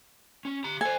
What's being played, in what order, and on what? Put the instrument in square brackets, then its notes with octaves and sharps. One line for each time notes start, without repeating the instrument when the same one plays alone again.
[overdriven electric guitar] C#4
G4 A#5
[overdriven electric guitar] A4 C5 [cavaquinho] G#5